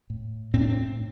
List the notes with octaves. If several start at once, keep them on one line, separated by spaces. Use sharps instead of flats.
A2
A2 C4
D4
C4